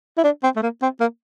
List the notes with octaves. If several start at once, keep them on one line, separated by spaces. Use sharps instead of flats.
E4
D4
C4
A3
A#3
C4
A#3